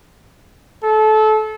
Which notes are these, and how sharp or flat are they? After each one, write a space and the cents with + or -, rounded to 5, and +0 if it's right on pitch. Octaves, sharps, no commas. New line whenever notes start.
A4 -25